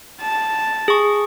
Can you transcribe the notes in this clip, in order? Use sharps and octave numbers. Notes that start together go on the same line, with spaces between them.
A5
G#4 C#6